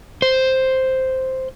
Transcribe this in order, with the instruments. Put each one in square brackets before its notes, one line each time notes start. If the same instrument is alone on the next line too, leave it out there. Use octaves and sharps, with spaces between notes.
[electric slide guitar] C5